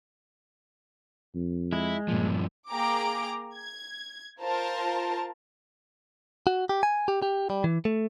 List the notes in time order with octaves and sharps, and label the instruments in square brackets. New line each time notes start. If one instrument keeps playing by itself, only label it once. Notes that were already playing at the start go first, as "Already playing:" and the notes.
[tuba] F2
[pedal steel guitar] G#3 [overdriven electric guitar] E4
[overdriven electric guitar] G2 F3 [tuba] A#2
[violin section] A#3 G#4 G5 A#5 D6 D7
G#6
F4 A#4 C5 A5
[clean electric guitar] F#4
G4
G#5
G4
G4
G3
E3
A3